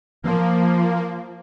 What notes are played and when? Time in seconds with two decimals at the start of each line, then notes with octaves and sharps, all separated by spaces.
0.23 F3 A#3